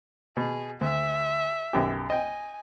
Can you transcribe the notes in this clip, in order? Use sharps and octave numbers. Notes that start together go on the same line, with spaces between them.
B2 G#4
D2 E5
B1 F#2 G4
D#5 G5 G#5